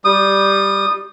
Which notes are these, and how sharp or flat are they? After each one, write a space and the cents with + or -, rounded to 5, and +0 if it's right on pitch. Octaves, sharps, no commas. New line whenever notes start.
G3 +0 D#6 -20